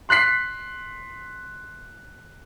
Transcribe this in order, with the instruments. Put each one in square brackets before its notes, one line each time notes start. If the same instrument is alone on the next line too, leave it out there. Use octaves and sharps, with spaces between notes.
[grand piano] C6 F#6 B6 C7